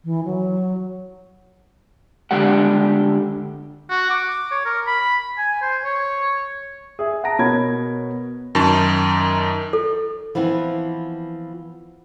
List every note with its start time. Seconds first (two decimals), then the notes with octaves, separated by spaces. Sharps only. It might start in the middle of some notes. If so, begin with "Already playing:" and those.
0.05 E3
0.25 F#3
2.31 D3 G#3 D4 G4 F#5
3.90 F#4
4.10 D6
4.51 C#5
4.65 A#4
4.87 B5
5.38 G#5
5.62 C5
5.84 C#5
6.99 G#4 E5
7.24 F#5 A5 A#5 A#6 D7
7.39 B2 B3 A#4 C#5 B5 G#6
8.55 F#2 D#3 D#4 A5 C#6
9.73 A4
10.35 E3 F3 B3 C4 E4